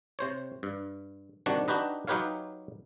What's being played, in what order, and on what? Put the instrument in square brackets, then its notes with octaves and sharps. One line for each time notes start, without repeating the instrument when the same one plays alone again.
[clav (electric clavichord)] C3 C5 C#5
G2
C3 D#3 G3 D4 F#4
D4 D#4 F#4 G4 B4 D#5
F#3 D#4 G4 B4 C#5 F5